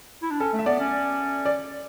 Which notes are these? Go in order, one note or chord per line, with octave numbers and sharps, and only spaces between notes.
E4
D4
C#4 A4
A3
E5
B3 D5
C#4
D5